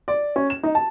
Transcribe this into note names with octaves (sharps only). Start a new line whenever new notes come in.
D5
C#4
E7
D#4
A5